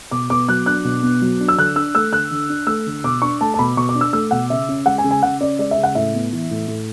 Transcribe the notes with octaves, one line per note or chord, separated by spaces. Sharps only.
B2 D6
B3 D6
F#3 F#6
D4 F#6
B2
B3
F#3
D4
E6
D3 F#6
D4 E6
A3 E6
D3 F#6
D3
D4
A3 E6
D3
B2 D6
D4 C#6
A3 A5
A5
B2 B5
B2 C#6
D6
D4
E6
A3 E6
B2 F#5
C#3 E5
C#4
G#3 F#5
G#5
C#3
G#5
C#3 F#5
C#4 D5
G#3 D5
E5
C#3
F#5
A2 E5
B3
E3
A2
A2